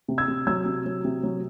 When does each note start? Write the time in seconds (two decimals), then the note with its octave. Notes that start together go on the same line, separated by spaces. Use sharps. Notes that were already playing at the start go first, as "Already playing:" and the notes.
0.08 C3
0.18 E6 G#6
0.28 C3
0.47 F#3 E6 G#6
0.66 C3
0.86 F#3
1.04 C3
1.23 F#3